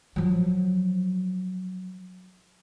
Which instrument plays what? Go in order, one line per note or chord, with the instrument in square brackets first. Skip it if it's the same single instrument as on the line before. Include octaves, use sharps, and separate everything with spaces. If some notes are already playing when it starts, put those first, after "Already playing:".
[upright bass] F3 F#3